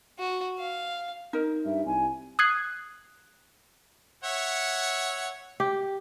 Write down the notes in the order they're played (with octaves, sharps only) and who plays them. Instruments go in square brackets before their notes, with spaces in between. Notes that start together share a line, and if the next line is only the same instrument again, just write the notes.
[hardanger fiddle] F#4
F5
[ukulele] D#4 A#4
[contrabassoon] G2 [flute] E5
[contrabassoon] C2 [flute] G#5
[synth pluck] D#6 F#6 G#6 C7
[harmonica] C#5 E5 F#5
[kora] G4